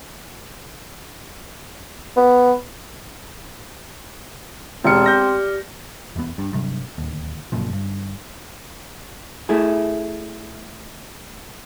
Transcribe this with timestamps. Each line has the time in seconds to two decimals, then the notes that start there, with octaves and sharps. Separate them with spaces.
2.17 B3
4.85 E1 C4 G4 D5 F6 C#7
5.06 G6 A#6
6.16 F1 E2 C3 B3
6.38 G2
6.53 G2 C3 F#3
6.98 D1 D#2
7.52 F#2 A#2 C#3 F3
7.71 G1 G2
9.49 A3 E4 G#4